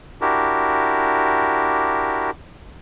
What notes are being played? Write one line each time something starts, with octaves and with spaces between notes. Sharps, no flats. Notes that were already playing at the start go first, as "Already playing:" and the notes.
D4 E4 F#4 G4 A#4